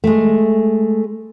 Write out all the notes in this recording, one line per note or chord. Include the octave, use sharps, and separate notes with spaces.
G#3 A3